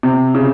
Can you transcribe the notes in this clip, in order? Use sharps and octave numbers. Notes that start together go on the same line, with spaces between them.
C3
C#3